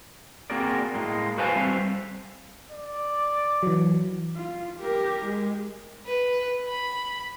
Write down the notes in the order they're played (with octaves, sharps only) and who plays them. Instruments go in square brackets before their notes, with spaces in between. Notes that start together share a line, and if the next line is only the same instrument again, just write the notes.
[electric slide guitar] A#3 C4 F#4 G#4 A#4 D5
A2 G#3 A#3
F#4 B4 C5 F5 G#5 A5
G3 A3 C4 C5 E5 F5
[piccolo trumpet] D5
[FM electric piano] E3 F#3
[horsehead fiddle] F4
G4 A#4
G#3
[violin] B4
B5